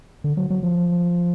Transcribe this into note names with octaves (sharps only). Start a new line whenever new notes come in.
D3
F#3
F#3
F3